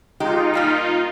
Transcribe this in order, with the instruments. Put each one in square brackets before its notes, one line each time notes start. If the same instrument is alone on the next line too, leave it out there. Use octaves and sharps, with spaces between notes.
[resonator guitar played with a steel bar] G#3 G4 [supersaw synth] D#4 F4
[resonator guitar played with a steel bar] A#2 G3 A#3